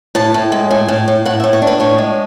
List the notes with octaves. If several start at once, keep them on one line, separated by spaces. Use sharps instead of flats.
A2 A5
A2
G#3
A2 G#5
A2
A2
A2 F#5
E5
A2
C#5
D4
B4
A2 C#5
G#3